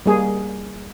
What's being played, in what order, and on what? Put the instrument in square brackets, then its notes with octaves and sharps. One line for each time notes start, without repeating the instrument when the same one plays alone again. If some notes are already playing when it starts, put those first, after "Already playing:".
[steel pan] G3 A#3 G#4